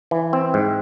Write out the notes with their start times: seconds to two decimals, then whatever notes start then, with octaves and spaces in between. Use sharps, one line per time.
0.11 E3
0.33 C4
0.54 G#2